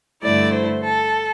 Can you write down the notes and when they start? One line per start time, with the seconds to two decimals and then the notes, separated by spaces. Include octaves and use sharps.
0.22 G2 D3 A3 E4 D5
0.53 C5
0.83 A4